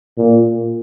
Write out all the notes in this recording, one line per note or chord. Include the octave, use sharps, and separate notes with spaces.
A#2